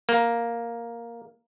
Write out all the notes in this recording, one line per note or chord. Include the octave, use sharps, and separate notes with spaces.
A#3